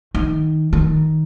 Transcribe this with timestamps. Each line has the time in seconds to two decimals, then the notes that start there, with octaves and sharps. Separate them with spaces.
0.15 D#3
0.73 D#3